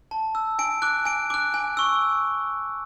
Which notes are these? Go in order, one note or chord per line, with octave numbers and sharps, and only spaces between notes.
A5
E6
G#5 D7
D6 F#6
G#5 D7
D6 F#6
G#5
C#6 E6